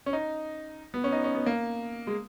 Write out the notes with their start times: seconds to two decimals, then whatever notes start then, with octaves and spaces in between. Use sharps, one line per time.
0.06 C#4
0.13 D#4
0.94 B3
1.04 C#4
1.12 D#4
1.24 C#4
1.35 B3
1.46 A#3
2.07 G#3